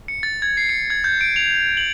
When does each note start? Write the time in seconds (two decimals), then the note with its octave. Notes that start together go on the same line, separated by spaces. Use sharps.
0.08 C#7
0.23 A6
0.42 G#6
0.57 C7
0.69 C#7
0.90 G#6
1.04 G6
1.21 D7
1.36 F7
1.77 F#7